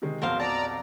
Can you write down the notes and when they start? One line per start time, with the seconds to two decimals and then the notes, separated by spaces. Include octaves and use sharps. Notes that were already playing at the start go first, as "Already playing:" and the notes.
0.02 C3 D#3 G#3
0.22 B1 F2 F#4 A#4 C5 F5
0.40 D5 A5 A#5